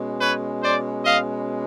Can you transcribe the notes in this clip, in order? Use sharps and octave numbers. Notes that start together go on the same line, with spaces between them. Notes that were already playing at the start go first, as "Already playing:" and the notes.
Already playing: B2 G#3 C#4
B4 C#5
C5 D5
D#5 F5